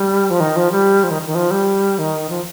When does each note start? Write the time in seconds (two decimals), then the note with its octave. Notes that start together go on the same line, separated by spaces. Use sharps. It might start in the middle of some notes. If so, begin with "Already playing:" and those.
Already playing: G3
0.30 F3
0.40 D#3
0.56 F3
0.72 G3
1.04 F3
1.11 D#3
1.26 D#3
1.35 F3
1.51 G3
1.99 D#3
2.30 F3